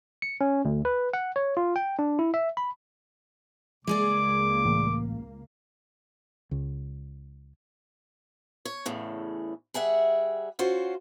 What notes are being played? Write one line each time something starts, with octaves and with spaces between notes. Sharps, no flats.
C#7
C#4
D2
B4
F#5
C#5
F4
G5
D4
E4
E5
B5
C#2 G#3 A#3 G#4 D5 D6
A1
C#2
C#5
E2 A2 C#3
G3 G#4 E5 F#5
C#4 F4 F#4 C5